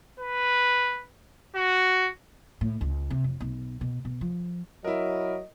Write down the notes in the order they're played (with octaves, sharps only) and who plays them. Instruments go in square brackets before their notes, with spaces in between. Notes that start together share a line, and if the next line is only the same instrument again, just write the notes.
[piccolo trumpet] B4
F#4
[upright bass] A2
C#2
C3
F2
B1
B2
B2
F3
[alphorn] F#3 [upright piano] E4 A#4 [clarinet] D#5